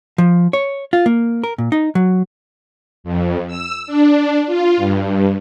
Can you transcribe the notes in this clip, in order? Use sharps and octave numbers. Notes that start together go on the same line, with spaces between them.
F3
C#5
F4
A#3
A#4
A#2
D#4
F#3
F2
E6
D4
F4
G2